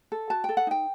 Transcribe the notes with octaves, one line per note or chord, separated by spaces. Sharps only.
A4
F#4 A5
A4 G5
F#5
D#4 G5